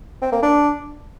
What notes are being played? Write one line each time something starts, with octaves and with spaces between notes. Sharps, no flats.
C4
A#3
D4